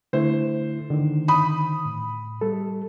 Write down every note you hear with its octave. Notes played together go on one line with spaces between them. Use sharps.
D3 A3 E4 C5
D3 D#3
B5 D#6
A2
G3 A4